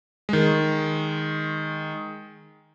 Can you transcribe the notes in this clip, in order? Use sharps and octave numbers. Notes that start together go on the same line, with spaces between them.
D#3 G#3